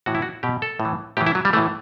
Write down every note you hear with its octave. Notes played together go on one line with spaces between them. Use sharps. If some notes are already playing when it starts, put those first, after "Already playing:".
A2 E3 F#4
E4
F#4
B2 G4
A4
A2
E3
A2 E3 G4
E4
F#3
G3
A2 E3 A3